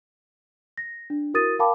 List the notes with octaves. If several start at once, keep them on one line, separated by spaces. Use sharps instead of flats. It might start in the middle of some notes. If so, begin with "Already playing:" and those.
A#6
D4
E4 F#4 A#4 D#6 A6 D#7
A#4 F5 G5 A5 B5 D6